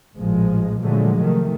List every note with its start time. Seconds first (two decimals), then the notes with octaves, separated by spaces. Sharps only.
0.16 A1 A#2 F3 G#3
0.81 A#2 D3 F3 F#3 G#3 A3
1.20 C3 D#3 A3